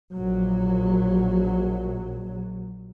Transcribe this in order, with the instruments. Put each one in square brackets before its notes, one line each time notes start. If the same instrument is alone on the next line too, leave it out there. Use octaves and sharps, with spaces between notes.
[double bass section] A#1 F#3